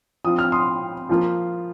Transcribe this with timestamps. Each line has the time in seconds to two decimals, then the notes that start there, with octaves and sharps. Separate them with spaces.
0.24 F3 C4 F4 D#6
0.39 F6
0.52 C6 D#6
1.09 F3 A#3 F4